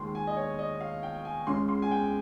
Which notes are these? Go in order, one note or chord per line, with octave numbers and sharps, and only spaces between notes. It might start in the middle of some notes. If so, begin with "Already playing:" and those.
Already playing: D#2 D#3 G#3 C6
G#5
D#5
C#5
D#5
F5
G5
G#5
C#2 C#3 G#3 C#4 C6
C6
G#5
G5